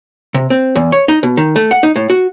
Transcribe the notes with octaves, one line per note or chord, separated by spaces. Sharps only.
C3
C4
E2
C#5
D#4
B2
D#3
A3
F#5
D#4
A2
F#4